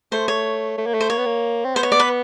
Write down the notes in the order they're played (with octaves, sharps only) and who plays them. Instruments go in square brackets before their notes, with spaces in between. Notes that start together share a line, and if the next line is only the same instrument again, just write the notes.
[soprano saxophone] A3 [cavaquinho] C5
[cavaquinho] C#5
[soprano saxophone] A3
A#3
A3
[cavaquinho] C5
[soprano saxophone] A#3 [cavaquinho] C#5
[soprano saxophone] B3
A#3
C4
[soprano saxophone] B3 [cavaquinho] C5
[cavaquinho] C#5
D5
B4